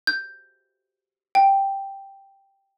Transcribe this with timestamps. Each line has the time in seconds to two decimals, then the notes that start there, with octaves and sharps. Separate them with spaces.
0.07 G6
1.35 G5